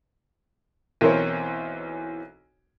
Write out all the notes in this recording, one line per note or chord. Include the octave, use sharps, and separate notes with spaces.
B1 E3 C4 A#4 C5 C#5